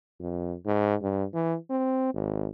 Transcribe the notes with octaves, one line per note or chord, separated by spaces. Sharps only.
F2
G#2
G2
E3
C4
G#1